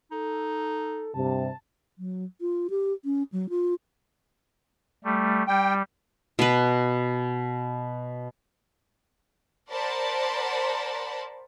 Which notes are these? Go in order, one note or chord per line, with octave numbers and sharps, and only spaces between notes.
D#4 A4
G2 C3 A5
F#3
F4
G4
C#4
F#3
F4
G3 A3
G3 G5
B2 B4
A#4 C5 D5 F#5 A5 B5